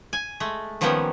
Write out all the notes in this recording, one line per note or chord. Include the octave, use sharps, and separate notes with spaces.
G#5
G#3 A3
D#3 F3 G3 A#3 B3 C#4